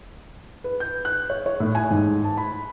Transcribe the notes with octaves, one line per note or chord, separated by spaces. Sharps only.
B4
G6
F#6
C#5
C#5
A2
G#5
G#2
A5
B5